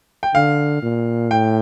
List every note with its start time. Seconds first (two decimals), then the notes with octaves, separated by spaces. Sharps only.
0.23 G5
0.35 D3 F5
0.82 A#2
1.31 A2 G5